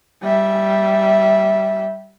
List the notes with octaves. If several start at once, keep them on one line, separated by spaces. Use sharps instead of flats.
G3 E5